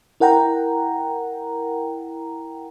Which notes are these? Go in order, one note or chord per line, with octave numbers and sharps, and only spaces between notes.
E4 A#4 F#5 G5 A#5